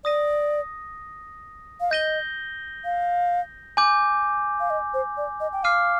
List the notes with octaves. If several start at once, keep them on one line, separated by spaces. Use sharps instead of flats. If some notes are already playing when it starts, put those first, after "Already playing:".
D5 D#6 A#6 D#7
F5
D#5 G6 A#6 D#7 G7
F5
G#5 D6 G6
F5
D#5
C5
D5
D#5
G5
F5 D6 F6 C7 D#7